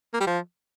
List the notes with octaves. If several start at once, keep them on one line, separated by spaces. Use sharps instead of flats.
A#3
G3
F3